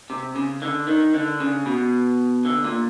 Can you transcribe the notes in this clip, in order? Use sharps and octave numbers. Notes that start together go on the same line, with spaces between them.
C3
C#3
D3
D#3
D3
C#3
B2
D3
A#2